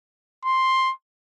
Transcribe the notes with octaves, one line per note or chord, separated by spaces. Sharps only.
C6